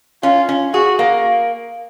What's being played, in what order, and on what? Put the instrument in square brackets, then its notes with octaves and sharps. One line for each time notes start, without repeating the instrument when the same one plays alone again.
[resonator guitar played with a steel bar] C#4 [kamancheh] F4
[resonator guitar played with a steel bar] C#4
[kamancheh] F#4 [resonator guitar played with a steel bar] G#4
[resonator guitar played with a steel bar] A#3